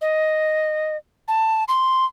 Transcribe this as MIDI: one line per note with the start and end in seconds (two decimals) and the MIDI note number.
0.01 0.96 75
1.28 1.64 81
1.68 2.05 84